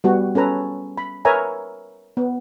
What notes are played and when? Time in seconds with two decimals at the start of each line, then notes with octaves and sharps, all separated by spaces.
0.04 G3 B3 F#4
0.35 C#4 A4 B4 A#5
0.98 B5
1.25 A#4 B4 C#5 E5 G#5 A#5
2.17 B3